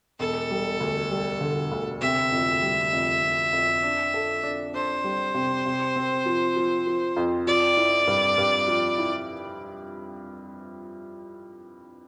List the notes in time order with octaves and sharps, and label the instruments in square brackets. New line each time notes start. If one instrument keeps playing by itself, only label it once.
[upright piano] E1 [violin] A4
[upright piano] G3
D2
G3
D3
D2
[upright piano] C3 [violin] E5
[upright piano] F2
G3
F2
F2
F2
D4
A4
D4
[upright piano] D4 [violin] C5
[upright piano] G3
C3
C3
C4
F3
F3
F3
F2
[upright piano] F3 [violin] D5
[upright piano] E4
G2
G2
F3
E4